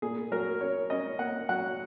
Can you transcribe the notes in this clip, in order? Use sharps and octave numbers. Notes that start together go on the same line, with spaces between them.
A#2 G#4
F#3 A#4
C#4 C#5
C#4 D#5
A#3 F#5
F#3 F#5